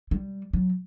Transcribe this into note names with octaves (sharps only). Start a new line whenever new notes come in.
G3
F#3